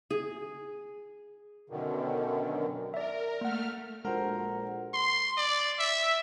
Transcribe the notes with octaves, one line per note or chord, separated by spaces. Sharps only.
G#4
F#2 B2 D3 D#3
A#4 D5 E5
A3 A#3 F#5 F6
A#1 G#3 F#4 A4 A#4 C5 F#5
C6
D5
E5